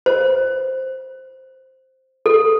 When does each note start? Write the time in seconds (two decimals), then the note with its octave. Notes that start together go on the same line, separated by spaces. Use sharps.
0.06 C5
2.26 A4